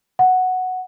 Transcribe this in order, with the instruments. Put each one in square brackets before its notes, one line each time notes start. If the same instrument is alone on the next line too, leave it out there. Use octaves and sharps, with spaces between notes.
[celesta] F#5